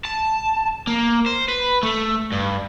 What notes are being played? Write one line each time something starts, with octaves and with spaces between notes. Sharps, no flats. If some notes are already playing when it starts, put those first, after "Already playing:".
A5
A#3
C5
B4
A3
G2